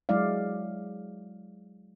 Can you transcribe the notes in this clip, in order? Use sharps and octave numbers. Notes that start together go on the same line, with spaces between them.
F#3 G#3 E4 D5 F5